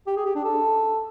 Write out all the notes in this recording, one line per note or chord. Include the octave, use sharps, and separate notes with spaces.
G4
G#4
G4
D4
A4